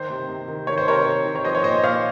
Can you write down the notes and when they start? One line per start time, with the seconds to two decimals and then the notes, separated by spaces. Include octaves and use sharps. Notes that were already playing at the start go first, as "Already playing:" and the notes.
Already playing: D#3 C5
0.10 C3
0.29 C3
0.48 D#3
0.67 D#3 C#5
0.78 C5
0.87 C3 A#4 C#5
1.06 C3
1.26 D#3
1.36 C#5
1.45 F3 C5 D#5
1.55 C#5
1.64 A#2 C5 D#5
1.78 D#5
1.83 A#2 C#5 F5